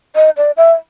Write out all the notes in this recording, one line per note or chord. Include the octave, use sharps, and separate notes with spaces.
D#5
D5
E5